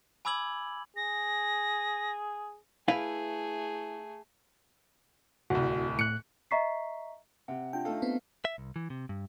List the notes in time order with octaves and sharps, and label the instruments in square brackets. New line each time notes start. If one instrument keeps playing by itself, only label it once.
[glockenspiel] G#5 B5 D6 E6 G#6 F#7
[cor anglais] G#4 [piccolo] A#6
[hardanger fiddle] A3 G#4 [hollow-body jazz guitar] E4 B4 F5
[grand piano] D1 C2 [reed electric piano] F#4
[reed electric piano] A2 F#6 [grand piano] C#7
[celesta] D#5 E5 A#5 C#6 B6 C7
[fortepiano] C3 [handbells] F#5
[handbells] D4 F4 [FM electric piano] G5
[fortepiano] A3 D#4 A4 [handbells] F5
[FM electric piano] B3 C4
[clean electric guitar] E5
C2
E3
C3
G2